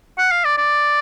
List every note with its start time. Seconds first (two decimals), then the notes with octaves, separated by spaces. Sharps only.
0.18 F#5
0.31 F5
0.45 D5
0.58 D5